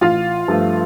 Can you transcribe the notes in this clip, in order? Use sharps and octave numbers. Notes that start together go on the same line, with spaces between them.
A1 F4 F5
G2 F3 A3